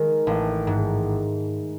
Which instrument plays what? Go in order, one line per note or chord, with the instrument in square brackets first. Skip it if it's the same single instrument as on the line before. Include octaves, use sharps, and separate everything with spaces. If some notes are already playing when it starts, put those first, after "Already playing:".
Already playing: [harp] D#3 G#3
A1
G#2